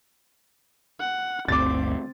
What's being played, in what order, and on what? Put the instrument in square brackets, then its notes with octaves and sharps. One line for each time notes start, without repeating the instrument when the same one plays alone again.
[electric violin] F#5
[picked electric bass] G1 D2 [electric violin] C4 [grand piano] D6 A6